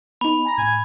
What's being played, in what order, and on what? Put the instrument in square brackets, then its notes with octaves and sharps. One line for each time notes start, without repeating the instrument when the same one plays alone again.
[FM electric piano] B3 D#4 [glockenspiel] B5
[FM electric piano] G#5 A#5 A#6
[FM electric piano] A2 [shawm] G#5